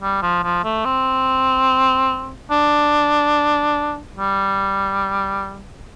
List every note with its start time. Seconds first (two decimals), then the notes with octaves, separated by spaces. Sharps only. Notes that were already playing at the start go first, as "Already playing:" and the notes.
0.02 G3
0.22 F3
0.43 F3
0.64 A3
0.85 C4
2.51 D4
4.17 G3